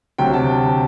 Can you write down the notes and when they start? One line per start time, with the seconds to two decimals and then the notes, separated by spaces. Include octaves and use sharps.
0.18 D2 C3 F#3 G5
0.34 A5